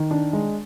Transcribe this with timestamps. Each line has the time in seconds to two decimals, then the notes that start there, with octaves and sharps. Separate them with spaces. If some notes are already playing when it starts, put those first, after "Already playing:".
Already playing: D#3
0.11 D4
0.33 G#3